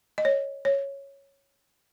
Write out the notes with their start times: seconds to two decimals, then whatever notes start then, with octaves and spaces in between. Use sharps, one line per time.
0.18 D#5
0.25 C#5
0.65 C#5